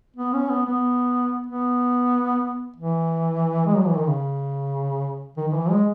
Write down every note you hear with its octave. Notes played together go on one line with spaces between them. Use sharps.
B3
C#4
B3
B3
B3
E3
G#3
F#3
E3
D#3
C#3
D#3
D#3
E3
G#3